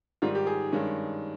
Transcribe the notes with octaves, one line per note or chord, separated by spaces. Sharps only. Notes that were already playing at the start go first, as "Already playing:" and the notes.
G#2 D#3 G3 F4
G4
G#4
G2 D#3 G#3 C#4